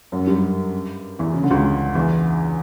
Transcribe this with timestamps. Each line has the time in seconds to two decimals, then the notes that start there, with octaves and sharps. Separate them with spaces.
0.12 F#2 F#3
0.27 G2 G3
1.19 E2 E3
1.34 C#3
1.43 D3
1.51 C#2 C#3
1.95 E2 E3